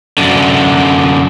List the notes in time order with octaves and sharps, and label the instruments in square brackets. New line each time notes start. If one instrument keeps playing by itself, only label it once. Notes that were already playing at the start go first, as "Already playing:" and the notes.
[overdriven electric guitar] F#2 D3